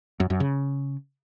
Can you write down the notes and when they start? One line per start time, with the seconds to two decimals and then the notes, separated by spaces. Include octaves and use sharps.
0.20 F#2
0.30 F#2
0.40 C#3